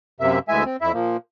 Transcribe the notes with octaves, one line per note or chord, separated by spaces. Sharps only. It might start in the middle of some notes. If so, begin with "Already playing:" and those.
F#2 C3 A#3 E5
D2 E3 G#3 E5 G#5
C4
F2 E4 E5
A#2 F3 A#3